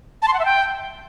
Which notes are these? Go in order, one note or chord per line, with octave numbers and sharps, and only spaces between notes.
A5
C6
F#5
E5
G5